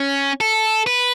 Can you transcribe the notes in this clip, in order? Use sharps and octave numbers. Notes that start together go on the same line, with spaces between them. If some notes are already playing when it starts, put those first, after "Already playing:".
Already playing: C#4
A4
B4